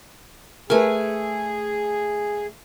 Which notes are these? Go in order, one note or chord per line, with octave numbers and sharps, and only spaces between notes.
A3 G#4 A#4 B4 G#5